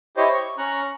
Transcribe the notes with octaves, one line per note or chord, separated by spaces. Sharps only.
E4 G4 C5 C#5 D#5
C#6
C#4 A#5 C#6 F#6